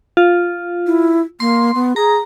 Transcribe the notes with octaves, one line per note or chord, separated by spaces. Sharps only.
F4
E4
A#3 C6
B3
G#4 A#5